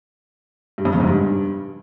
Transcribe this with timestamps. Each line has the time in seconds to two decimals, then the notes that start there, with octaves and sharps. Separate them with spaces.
0.78 G2
0.85 F2
0.93 C#3
1.00 G#2
1.07 G2